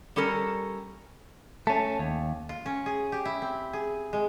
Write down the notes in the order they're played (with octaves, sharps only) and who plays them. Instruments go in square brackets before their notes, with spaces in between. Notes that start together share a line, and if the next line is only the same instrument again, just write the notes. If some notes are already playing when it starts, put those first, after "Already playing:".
[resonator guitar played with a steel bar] G3 C#4 A4 A#4
[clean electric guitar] A3 C#4 [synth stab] A5
[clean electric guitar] D#2
[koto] F4
C#4
G#4
G4
E4
C4
G#4
G#3